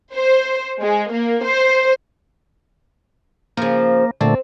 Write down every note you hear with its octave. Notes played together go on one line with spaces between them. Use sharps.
C5
G#3
A#3
C5
C#3 F3 A#3
A#2 D3 A3 C4